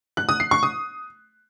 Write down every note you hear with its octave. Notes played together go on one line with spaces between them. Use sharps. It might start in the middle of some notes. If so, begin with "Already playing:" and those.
F#6
D#6
C7
C#6
D#6